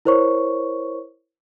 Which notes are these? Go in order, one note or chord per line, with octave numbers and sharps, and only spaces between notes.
E4 A#4 C5 C#5 C#6